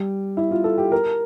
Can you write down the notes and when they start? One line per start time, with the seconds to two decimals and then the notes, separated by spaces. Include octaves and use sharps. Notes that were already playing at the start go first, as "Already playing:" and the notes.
Already playing: G3
0.37 E4
0.51 F4
0.64 A4
0.78 G4
0.92 A#4